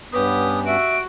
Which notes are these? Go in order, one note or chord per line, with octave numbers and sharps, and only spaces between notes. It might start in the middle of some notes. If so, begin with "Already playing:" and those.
G2 B3 C#4 G4 B4 D#6
F#4 E5 D7